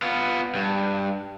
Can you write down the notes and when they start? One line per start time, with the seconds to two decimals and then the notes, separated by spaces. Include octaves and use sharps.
0.02 B3 F4
0.54 G2